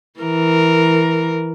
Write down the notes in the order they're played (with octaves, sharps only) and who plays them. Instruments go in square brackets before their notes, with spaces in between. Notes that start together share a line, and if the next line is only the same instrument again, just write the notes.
[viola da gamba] E3 A#4